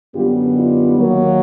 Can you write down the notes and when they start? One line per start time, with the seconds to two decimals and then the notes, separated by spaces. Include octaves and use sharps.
0.14 F#2 D3 G3 B3 F4 G4
0.56 D#4 F4
0.98 D#2 D#3 F#3 A#3